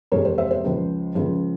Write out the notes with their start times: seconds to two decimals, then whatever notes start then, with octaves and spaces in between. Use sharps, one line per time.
0.12 F2 C3 E3 G#3 A#4 C#5
0.25 C5
0.38 C5 E5
0.51 C5
0.64 C#2 C#3 F3
1.15 C#2 C#3 F3